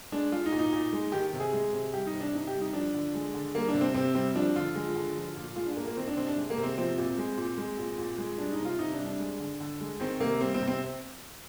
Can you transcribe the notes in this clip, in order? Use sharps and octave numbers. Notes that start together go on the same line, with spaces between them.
G#3 D4
G#3 F4
D#4
A#2
D#4
A#2
G#3
D#3 G4
C3
G#4
G#3
C3
G3 G4
D#4
C3
D4
C3 D#4
G4
G3
D#4
F3 D4
D3
G#3
D3
G3 A#3
D4
C3
C4
C3 C4
G3 C4
F3 D4
D3 F4
G#3
D3
F3
A#2
G#3 F4
D4
A#2 A#3
A#3
D#3 C4
D4
C3 C4
D4
G#3
A#3
C3
C4
F3 C4
A#2
G#3
A#2
G#3
A#2
A#2
G#3
G3 D4
D#4
C3
F4
C3 D#4
D4
G3
D4
G#3
D3
D3
G#3
D#3 C4
C3 A#3
G3 C4
C4
C3
C4